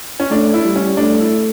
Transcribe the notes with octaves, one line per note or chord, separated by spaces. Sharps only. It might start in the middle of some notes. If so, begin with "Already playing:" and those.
C#4
A3 D4
E4
G3
C#4
A3 D4
E4